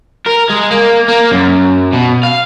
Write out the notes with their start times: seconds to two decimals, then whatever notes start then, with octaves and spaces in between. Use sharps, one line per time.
0.27 A#4
0.50 G#3
0.71 A#3
1.08 A#3
1.31 F#2
1.93 B2
2.23 F5